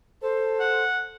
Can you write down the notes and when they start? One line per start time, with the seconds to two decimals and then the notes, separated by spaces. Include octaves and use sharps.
0.22 A4 C5
0.60 F#5